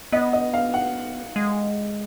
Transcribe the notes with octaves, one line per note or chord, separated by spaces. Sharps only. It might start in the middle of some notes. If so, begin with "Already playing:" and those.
B3 D#5
D#5
F5
F#5
G#3